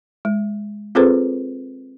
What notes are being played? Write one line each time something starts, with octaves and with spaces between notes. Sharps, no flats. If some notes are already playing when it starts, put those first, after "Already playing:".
G#3
C4 F4 G#4 A4 B4 C5